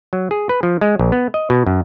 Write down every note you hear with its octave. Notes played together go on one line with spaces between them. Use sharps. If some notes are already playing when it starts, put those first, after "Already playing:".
F#3
G#4
B4
F3
G#3
A#1
B3
D#5
B2
F#2